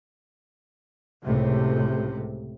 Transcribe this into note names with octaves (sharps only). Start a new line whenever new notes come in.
C#2 A2 C3